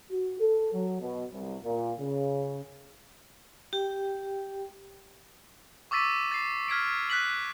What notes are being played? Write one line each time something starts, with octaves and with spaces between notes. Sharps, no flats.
F#4
A4
F#3
B2
C2
A#2
C#3
G4 G5
C#6 D6 E6 A6 B6 D#7
A6 C7
F6 G#6 B6 D7
F#6 B6 F#7